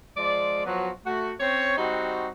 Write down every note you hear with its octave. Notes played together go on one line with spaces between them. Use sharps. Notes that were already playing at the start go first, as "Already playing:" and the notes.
F3 G#3 D5
F3 F#3 B3 F#4
A3 F#4
C4 C#4 C#5
G3 C4 D#4 F#4